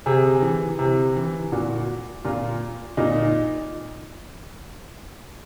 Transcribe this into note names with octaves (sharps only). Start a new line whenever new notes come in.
C3 G#4
E3
C3
E3
A#2 F#4
A#2 F4
A#2 D#4